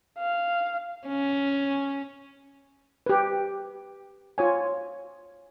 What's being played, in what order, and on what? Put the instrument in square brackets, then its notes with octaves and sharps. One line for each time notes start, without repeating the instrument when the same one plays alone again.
[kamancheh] F5
[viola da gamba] C#4
[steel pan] G4 B4
F4 C#5 G#5